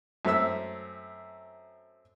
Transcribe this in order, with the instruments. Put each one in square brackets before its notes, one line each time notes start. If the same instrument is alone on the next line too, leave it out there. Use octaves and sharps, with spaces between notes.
[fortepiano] F#2 A3 C4 E5 E6